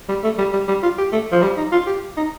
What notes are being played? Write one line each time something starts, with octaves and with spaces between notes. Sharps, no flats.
G3
A3
G3
G3
G3
F4
G4
A3
F3
G3
D#4
F4
G4
D#4